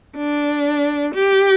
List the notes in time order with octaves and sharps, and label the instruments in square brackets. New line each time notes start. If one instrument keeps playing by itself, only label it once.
[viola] D4
G4